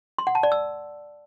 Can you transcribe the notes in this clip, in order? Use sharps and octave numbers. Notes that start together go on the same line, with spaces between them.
C6
F#5
A5
D5
E6